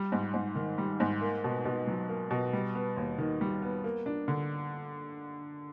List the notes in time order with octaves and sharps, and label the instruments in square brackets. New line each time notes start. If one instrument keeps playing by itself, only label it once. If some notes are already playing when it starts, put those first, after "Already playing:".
Already playing: [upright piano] G3
G#2
G#2
D#3
G3
G#2
A#3
B2
B2
F#3
A#3
B2
G3
B3
D#2
D#3
G3
B3
A#3
D4
D3